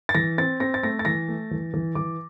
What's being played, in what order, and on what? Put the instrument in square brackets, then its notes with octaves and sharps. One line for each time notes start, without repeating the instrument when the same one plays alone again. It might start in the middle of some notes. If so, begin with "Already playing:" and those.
[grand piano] A6
E3 A#6
C4 A6
C4 A#6
A6
A3 A#6
A6
E3 A#6
A3
E3
E3
E3 D6